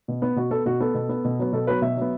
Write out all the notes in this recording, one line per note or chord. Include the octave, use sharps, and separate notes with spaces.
B2
B3
B2 F#4
B3 A4
B2 F#4
B3 A4
B2
B3
B2
F#3 B3
B2 A4
F#3 B3 B4
B2 E5
F#3 B3